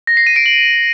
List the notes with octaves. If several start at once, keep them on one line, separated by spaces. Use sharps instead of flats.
A#6
C7
D#7
D7
F#7